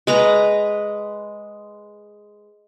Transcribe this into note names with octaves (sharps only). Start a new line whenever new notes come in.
G#3 B4 A#5